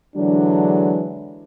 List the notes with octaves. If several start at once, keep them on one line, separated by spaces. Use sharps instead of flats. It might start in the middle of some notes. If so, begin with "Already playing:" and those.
D3 E3 F#3 G#3 D4